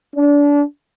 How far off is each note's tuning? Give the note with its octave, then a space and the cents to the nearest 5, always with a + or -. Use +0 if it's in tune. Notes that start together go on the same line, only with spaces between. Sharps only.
D4 -25